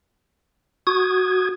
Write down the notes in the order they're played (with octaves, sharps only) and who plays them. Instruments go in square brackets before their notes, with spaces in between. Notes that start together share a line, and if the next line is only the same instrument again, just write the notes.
[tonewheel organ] F#4 D#6 G#6